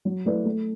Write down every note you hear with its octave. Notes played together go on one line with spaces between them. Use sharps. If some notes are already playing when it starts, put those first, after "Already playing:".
F#3
A3 E4 B4 D5
A3